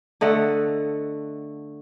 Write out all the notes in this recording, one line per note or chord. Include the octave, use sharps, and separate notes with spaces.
D3 A3 D#5 F#5